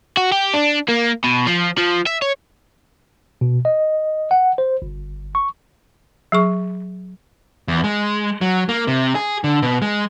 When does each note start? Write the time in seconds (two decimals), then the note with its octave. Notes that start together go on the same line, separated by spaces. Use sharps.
0.17 F#4
0.32 G4
0.54 D4
0.89 A#3
1.24 B2
1.47 F3
1.78 F3
2.06 E5
2.22 C#5
3.41 B2
3.65 D#5
4.31 F#5
4.58 C5
4.82 G1
5.35 C#6
6.32 F#3 G#4 C#6
7.68 E2
7.84 G#3
8.41 F#3
8.69 A#3
8.87 C3
9.15 G#4
9.44 D3
9.62 B2
9.82 G#3